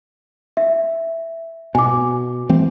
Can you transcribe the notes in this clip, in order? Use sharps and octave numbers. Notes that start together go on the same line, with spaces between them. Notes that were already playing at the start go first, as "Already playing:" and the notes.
E5
B2 G#5 D6
E3 A3 C4